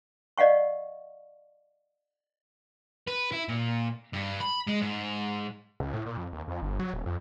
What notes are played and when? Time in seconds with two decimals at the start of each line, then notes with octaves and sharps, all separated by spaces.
0.38 D5 D#5 F5 F#5 C#6
3.07 B4
3.32 E4
3.49 A#2
4.13 G2
4.40 B5
4.67 G#3
4.81 G#2
5.80 C#2
5.94 A2
6.06 A#2
6.17 F2
6.33 D#2
6.48 F2
6.62 G1
6.80 F#3
6.94 D#1
7.06 F2